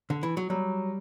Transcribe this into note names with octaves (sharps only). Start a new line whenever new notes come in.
D3
E3
F#3
F#3 G3